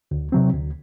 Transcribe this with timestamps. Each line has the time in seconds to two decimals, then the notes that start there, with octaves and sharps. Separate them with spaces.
0.11 D2
0.32 C3 F#3 C4
0.53 D2